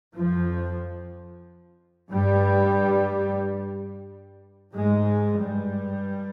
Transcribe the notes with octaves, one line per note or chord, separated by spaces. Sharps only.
F2 F3
G2 G3
G#2 G#3
G2 G3